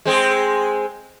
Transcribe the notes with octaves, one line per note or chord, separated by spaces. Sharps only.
G#3 C4 G#4